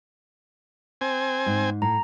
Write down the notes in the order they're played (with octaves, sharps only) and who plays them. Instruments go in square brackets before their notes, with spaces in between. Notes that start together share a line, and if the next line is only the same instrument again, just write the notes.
[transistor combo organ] C4 G#5
[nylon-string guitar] G#2
[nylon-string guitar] A2 [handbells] A#5